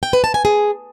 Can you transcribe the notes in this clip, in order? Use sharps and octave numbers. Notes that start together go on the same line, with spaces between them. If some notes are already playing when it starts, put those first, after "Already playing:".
G5
B4
A5
G#5
G#4